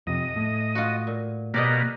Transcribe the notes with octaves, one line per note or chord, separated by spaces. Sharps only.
F2 C3 D#5
A2
F4 F#4
A#2
B2 A#3 G4 D5 D#5